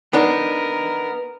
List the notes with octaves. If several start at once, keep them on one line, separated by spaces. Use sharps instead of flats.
B3 D4 D#4 A#4